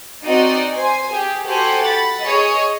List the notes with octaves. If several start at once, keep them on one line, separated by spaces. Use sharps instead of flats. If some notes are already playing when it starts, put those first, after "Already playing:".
C4 D#4 F#4 D5 D#5
C5 G#5
G4 G#4
F#4 G4 A4 C5 F#5 G#5
F#5 B5 A6
G#4 C#5 D#5